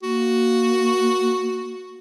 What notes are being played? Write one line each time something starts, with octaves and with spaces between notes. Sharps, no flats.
A#3 F#4